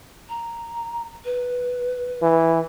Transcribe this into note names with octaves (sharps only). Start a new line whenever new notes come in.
A#5
B4
E3